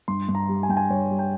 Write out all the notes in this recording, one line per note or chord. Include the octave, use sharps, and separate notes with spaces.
G2 C6
G2
A#5
G3
G#5
G2 G5
G#5
G2 C#5
G3
G5